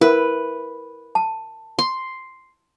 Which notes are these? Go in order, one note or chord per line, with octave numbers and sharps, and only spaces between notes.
E4 A#4 B4
A5
C6